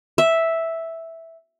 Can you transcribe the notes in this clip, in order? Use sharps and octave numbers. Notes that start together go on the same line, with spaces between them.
E5